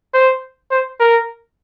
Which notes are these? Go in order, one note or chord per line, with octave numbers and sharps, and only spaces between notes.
C5
C5
A#4